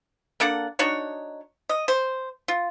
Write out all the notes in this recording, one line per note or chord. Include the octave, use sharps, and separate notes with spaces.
A#3 D4 A4 F#5
D4 D#4 F#4 C#5
D#5
C5
F4